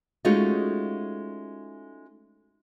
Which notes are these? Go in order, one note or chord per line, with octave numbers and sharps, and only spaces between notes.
G#3 A3 C#4 D#4 F4 F#4